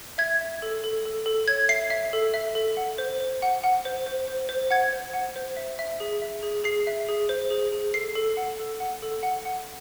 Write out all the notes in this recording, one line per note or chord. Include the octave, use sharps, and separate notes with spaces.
E5 G#6
E5
A4
A4
A4
A4
C#5 G#6
E5 C7
E5
A4
E5
A4
F#5
C5
C5
F#5
F#5
C5
C5
C5
C5
F#5 G#6
C5
F#5
C5
E5
E5
G#4
E5
G#4
G#4 C7
E5
G#4
C5
G#4
G#4
A4 C7
A4
F#5
A4
F#5
A4
F#5
F#5